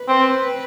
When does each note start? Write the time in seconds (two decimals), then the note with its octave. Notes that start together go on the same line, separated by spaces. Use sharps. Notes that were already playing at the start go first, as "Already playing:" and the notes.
Already playing: B4
0.09 C4